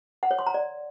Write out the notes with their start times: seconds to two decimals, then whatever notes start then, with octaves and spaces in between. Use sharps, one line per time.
0.23 F#5
0.31 C#5
0.39 C6
0.46 A#5
0.54 D5